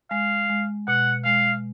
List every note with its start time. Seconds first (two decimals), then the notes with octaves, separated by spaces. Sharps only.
0.11 G#3 F5
0.49 G#3
0.88 B2 F#5
1.25 G#3 F5